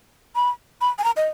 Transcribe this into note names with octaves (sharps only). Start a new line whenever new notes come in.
B5
B5
G#5
A#5
D#5